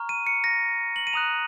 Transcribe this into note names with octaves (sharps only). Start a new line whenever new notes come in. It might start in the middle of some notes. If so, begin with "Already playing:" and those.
Already playing: A#5 C#6 F6
D#7
C#7
A#6
F#7
D#7
A#5 D#6 F#6 F7